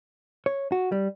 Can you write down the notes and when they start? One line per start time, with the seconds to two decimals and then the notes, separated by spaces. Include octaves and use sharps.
0.46 C#5
0.72 F#4
0.92 G3